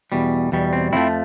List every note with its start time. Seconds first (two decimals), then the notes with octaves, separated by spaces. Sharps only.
0.12 E2 B2 G3
0.52 E2 B2 G3
0.73 C4
0.93 F2 D3 F3 A3 C4 E4